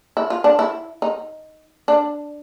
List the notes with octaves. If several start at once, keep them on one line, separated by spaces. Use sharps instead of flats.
E4
F4
D4
E4
D#4
D4